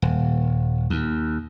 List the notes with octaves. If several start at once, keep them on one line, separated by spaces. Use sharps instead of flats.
D#1
D#2